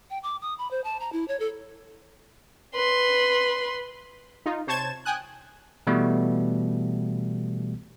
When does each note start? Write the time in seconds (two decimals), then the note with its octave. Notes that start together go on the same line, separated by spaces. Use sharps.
0.10 G5
0.23 D6
0.42 D#6
0.58 B5
0.71 C5
0.84 A5
1.00 A#5
1.13 E4
1.28 C#5
1.40 A4
2.75 B4 C6
4.46 D#4 F4
4.67 C3 C5 C#5 A5 G#6 E7
5.05 G5 G#5 D#6 F#6
5.87 B2 E3 G3 A3 B3